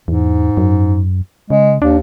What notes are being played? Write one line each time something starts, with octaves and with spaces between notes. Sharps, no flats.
E2 G#2
F#2
C#3 G#3
D#2 D4